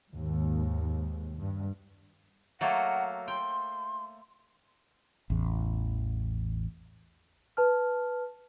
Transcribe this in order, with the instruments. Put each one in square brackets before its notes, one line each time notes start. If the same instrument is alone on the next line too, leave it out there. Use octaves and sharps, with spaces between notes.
[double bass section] D#2 G#2
G2
[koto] F#3 A3 A#3 [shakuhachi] F#5
[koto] G5 [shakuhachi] C6
[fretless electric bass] A1 E2
[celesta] B4 A5 F6